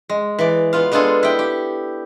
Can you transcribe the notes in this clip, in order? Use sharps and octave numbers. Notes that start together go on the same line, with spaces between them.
G#3
E3 D5
B3 F4 F5
G#3 B3 D4 F4 G#4 A4
E4 G5
G4